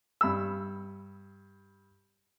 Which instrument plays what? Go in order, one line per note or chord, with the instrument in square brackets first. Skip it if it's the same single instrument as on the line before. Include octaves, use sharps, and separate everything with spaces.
[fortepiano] G2 B5 E6